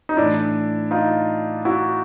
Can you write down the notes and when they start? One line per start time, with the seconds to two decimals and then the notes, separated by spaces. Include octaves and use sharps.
0.09 D#4
0.17 A2 E3 D4 E4
0.91 D#4 F4
1.65 E4 F#4